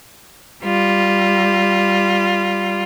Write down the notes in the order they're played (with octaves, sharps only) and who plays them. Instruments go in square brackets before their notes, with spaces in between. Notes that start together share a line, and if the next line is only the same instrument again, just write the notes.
[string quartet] G3 F4